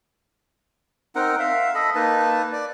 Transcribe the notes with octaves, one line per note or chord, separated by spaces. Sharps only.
C4 D#4 A#4 F#5
E5 F5
A4 D#5 B5
A#3 D#4 B4 A5
D5